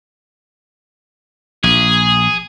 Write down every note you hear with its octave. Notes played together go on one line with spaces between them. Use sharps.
A#1 G#4